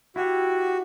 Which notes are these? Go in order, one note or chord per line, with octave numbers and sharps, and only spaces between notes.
E4 F#4 G4